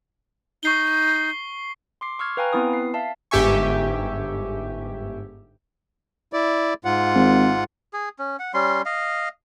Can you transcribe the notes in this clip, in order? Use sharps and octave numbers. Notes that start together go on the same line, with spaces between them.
D#4 C#6 C7 G7
C6 D6 C7
C#6 E6 F6 G#6
B4 F5 G5 G#5 A#5
B3 C4 E4 B4 D#6
C7
E5 F5 A5
G1 G#2 G4 E5 G#5 C#6
E4 D5
G#2 F4 F#5
G#1
G#4
C#4
F#5
G3 C#4 C6
D#5 F5